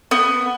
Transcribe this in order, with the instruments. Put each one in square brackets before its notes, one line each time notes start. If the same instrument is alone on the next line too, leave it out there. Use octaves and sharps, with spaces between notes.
[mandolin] B3